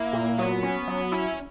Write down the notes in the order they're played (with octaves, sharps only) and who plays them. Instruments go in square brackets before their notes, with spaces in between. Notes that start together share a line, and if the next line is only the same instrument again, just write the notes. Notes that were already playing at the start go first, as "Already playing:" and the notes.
Already playing: [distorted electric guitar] A#3 [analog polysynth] E4
[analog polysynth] A#2
[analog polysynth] F#3 [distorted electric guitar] B3
[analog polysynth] C#4
F#3
[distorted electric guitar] C#4 [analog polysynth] E4